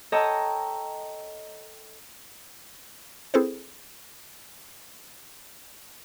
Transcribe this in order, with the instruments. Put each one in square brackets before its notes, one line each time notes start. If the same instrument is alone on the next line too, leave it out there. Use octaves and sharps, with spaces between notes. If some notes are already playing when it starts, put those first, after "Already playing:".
[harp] A4 C#5 D#5 G5 A5 A#5
[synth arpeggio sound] C4 E4 G#4 A4 B4 C5